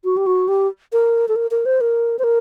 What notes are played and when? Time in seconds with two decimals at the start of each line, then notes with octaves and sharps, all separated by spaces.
0.04 F#4
0.17 G4
0.26 F#4
0.48 G4
0.93 A#4
1.28 A4
1.36 A#4
1.51 A#4
1.66 C5
1.81 A#4
2.19 C5
2.24 A#4